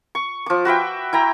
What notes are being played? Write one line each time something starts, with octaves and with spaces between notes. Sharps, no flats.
C#6
F3 D6
F#4 B4 E5 G5
E4 G5 A#5